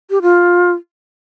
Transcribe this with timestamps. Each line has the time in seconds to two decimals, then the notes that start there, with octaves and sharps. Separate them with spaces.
0.10 G4
0.22 F4